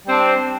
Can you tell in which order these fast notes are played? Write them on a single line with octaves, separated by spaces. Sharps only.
G3 C4 D4